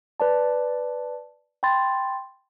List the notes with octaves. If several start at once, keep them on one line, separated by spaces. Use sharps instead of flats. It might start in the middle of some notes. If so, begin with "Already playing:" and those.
B4 D5 A5
G5 B5 C6 A6